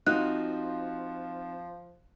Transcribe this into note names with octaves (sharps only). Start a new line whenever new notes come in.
F3 C4 D#4 F4 F#4 F#6